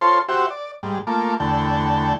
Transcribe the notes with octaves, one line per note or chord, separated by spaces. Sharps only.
F4 A4 C5 C#5 C6
F#4 G4 C5 E5
D5
G#2 G3
A3 A#3 F4 D6
E2 D3 A3 G5